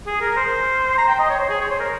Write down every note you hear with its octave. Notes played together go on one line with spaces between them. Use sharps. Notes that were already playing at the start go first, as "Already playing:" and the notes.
G#4
A#4
C5
A#5
G5
D#5
C#5
C5
G#4
C#5
C5
A#4